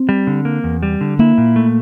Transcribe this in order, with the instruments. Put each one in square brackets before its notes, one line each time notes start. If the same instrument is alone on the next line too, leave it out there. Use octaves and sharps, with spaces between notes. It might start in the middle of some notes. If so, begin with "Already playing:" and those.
Already playing: [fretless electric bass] C4
[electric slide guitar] G3
D3
A#3
E2
G3
D3
[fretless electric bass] A#3 [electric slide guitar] E4
[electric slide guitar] A#2
A3